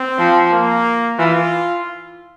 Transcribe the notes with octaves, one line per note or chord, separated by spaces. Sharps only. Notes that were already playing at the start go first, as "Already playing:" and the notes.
Already playing: C4
F3
A#3
E3 F4